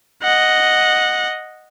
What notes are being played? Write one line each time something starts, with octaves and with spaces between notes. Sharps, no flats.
D#5 F#5